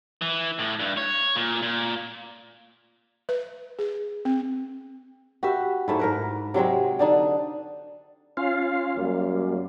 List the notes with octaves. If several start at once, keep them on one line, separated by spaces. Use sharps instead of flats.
E3
A2
G2
C#5
A#2
A#2
B4
G#4
C4
F#4 G4 B4 E5
G#2 A3 E4
G#2 A#4 B4
C3 F#3 G#3 C4
D3 D4 D#4
C#4 F4 F5
F#2 G3 A#3